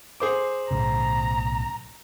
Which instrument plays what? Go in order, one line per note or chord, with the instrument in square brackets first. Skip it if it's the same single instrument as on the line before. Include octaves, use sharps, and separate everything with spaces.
[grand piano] G#4 C5 D6
[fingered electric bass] B1 A2 C#3 [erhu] A#5